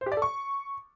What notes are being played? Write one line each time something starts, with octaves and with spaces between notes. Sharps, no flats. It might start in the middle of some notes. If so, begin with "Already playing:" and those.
C5
G4
D5
A4
C#6